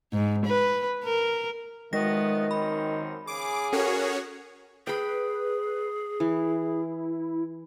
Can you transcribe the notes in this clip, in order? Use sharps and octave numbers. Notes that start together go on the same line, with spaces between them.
G#2
B4
A#4
D#3 F3 G#3 A3 B3 A#6
F#2 C4 D#4 B5
C#3 G#4 D6
C#4 F#4 A4 A#4 C#5
G#4 B4 G5 B5
E3 E4